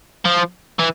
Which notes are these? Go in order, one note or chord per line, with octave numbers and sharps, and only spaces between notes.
F3
E3